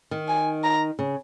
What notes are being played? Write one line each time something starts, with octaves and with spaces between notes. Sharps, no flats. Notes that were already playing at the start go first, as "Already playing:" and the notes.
D#3
G#5
A#5
C#3